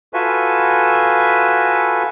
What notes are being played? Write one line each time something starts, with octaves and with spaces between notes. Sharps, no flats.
F4 F#4 A4 B4 E5 G#5